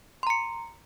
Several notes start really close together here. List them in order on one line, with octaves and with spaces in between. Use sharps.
C6 A#5 C#7